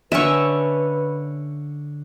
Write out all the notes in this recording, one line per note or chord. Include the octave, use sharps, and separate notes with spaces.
D3 C#4 B4 E5 C#6